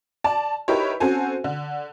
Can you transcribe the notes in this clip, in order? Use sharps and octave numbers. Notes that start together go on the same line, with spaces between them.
D5 A5
D#4 E4 G4 A#4 B4 C#5
C4 C#4 F#4 A4 C5 G#5
D3